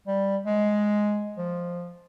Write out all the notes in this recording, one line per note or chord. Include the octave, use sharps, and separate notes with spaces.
G3
G#3
F3